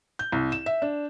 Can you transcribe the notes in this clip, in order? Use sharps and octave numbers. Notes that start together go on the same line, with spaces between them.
G6
C2
E7
E5
D4